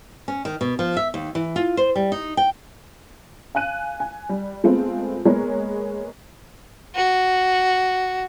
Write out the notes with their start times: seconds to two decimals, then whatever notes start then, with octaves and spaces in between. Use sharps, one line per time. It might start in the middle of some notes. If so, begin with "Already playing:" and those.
0.28 C#4
0.45 D#3
0.61 B2
0.79 F3
0.97 E5
1.14 D#2
1.35 E3
1.56 F4
1.77 C5
1.96 G3
2.12 D#4
2.37 G5
3.55 F5 G#5 F#6 D#7
4.00 G#5
4.29 G3
4.64 G#3 A3 B3 C4 F4 G#4
5.25 G#3 A#3 B3 A#4 C#5
6.95 F#4